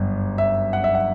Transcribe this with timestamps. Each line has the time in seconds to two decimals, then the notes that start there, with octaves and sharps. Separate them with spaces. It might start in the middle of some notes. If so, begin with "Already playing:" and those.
Already playing: G1 F#2
0.38 E5
0.73 F#5
0.84 E5
0.95 F#5